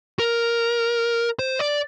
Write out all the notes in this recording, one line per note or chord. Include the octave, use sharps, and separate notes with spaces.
A#4
C5
D5